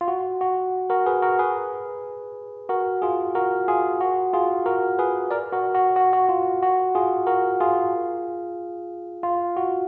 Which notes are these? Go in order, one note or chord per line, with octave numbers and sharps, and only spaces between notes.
F4
F#4
F#4
F#4 A#4
G#4 B4
F#4 A#4
G#4 B4
F#4 A#4
F4 G#4
F#4 A#4
F4 G#4
F#4
F4 G#4
F#4 A#4
G#4 B4
A#4 D5
F#4 A#4
F#4
F#4
F#4
F4
F#4
F4 G#4
F#4 A#4
F4 G#4
F4
F#4